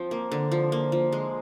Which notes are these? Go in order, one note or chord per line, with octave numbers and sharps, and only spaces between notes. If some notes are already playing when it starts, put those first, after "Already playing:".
Already playing: F3 C4 G5
A#3
D3
F3
A#3
F3
G#3